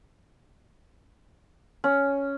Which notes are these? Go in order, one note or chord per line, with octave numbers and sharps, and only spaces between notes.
C#4